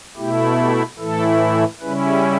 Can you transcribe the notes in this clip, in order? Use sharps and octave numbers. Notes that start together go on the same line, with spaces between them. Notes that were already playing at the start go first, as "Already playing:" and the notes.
B2 A3 E4 G4
G4
A2 E3 A3 E4 A4
C#3 G3 C#4 E4 B4